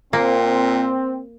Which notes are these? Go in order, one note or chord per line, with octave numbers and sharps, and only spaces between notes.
A#2 A#3 C4